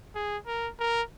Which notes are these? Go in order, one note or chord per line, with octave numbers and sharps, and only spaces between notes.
G#4
A#4
A#4